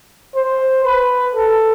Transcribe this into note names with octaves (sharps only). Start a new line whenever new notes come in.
C5
B4
A4